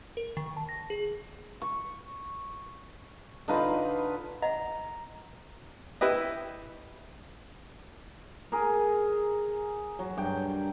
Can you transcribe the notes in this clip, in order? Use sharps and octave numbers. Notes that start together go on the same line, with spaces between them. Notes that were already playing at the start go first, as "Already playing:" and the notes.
A#4
D#3
A5
A#6
G#4
C#6
D3 D#4 F4 B4
D#5 F#5 A#5
E4 G4 B4 D#5
G#4 A#4
F#3
G2 G5